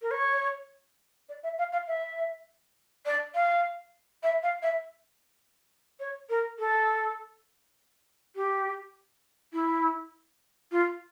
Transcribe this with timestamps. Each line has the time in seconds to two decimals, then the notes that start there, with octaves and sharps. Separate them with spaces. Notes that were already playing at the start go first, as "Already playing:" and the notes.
0.02 A#4
0.11 C#5
1.29 D5
1.43 E5
1.58 F5
1.72 F5
1.88 E5
3.06 D5
3.35 F5
4.23 E5
4.43 F5
4.63 E5
6.00 C#5
6.29 A#4
6.59 A4
8.36 G4
9.53 E4
10.72 F4